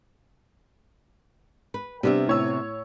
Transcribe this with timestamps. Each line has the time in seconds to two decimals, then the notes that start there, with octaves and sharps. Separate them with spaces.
1.74 B4
2.03 C3 G3 B3 D4 E5
2.28 A2 C#5 E6